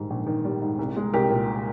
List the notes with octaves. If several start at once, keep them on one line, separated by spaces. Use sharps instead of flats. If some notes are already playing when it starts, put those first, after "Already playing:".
Already playing: A#1 G#2 D#3 G3
A#1
D#3
G3
G#2
C2
G#3
C2 G4 A#4
A#2